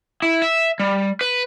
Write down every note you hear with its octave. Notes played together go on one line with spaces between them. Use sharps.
E4
E5
G3
B4